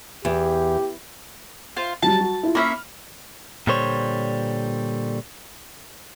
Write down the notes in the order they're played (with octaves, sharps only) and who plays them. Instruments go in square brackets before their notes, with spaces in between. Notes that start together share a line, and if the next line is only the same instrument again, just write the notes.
[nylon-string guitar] E2 [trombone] G4
[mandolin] F4 C5
[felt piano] F#3 G3 [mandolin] A5
[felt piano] F#4
E4 F4
[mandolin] A#3 C#4 E5 [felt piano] B5 F6
[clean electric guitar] A#2 D3 G3 C5 C#5